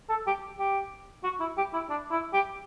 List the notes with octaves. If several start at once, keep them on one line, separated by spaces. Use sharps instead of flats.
A4
G4
G4
F#4
E4
G4
E4
D4
E4
G4